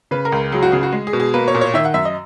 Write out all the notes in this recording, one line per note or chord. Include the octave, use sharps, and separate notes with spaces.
C#3 B4
A#4
C#2
F#3 G#4
F#4
C#3 G#4
F#4
G#3 G#4
G#4
B2
G#4
A#3 B4
C#5
A#2
C#5
D#3 E5
F#5
F#2 E5
D#5